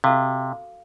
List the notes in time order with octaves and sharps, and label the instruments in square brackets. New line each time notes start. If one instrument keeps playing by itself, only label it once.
[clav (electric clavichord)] C3 [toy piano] F#4 A4 F5